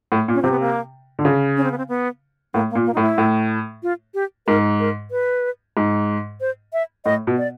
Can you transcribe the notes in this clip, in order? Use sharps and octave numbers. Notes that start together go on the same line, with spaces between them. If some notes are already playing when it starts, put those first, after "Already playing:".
A2
A#2
C#4
C3 C4
B3
A#3
D3
C#3
C#4
C4
B3
C4
B3
A2 A#3
A#3
A#2
A#3
A2 D#4
E4
A2
F4
G4
G#2 A#4
A#4
B4
G#2
C5
E5
A2 D#5
B2
D5